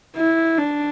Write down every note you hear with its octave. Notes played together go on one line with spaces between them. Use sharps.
E4
D4